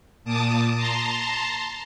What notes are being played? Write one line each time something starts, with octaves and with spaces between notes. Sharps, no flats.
A#2 A5 D6 D#6
A5 A#5 C6